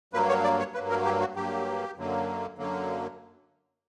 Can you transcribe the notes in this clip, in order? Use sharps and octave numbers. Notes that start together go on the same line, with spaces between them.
G2 F#3 A#3 B4
C#5
D5
C#5
G2 F#3 A#3 B4
A#4
G4
F#4
G2 F#3 A#3 G4
F#2 D3 F#3 A#3
F#2 D3 F#3 A#3